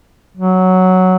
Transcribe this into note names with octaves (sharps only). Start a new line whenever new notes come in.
F#3